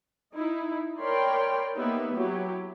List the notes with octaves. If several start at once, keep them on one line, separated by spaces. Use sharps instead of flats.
D#4 E4
A#4 C#5 D5 G5 B5 C6
A#3 B3 D#4 G4 B4 E5
F#3 E4 G4